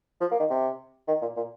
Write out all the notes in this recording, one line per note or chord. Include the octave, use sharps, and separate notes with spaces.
F3
A#3
D#3
C3
D#3
A#2
A#2